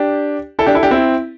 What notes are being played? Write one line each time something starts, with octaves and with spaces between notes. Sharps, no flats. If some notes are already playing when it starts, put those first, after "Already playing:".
Already playing: D4 G4
E4 A4
D4 G4
E4 A4
D4 G4
C4 E4